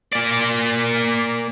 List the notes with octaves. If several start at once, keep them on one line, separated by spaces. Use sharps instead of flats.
A#3 D5